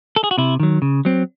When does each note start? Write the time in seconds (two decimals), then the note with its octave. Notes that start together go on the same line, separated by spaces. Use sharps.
0.16 A4
0.24 G#4
0.31 F#4
0.38 C3 E4
0.60 D#3 F#3
0.82 C#3
1.05 F#3 C4